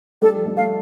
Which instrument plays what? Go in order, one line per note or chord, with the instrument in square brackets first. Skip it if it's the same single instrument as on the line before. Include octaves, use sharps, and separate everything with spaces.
[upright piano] G3 [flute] A4
[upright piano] F3
G3
[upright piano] A3 [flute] F5